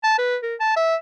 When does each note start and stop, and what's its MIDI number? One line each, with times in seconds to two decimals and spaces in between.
0.04 0.17 81
0.18 0.37 71
0.43 0.55 70
0.60 0.75 81
0.76 0.96 76